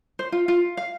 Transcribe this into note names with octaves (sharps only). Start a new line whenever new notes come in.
C5
F4
F4
F5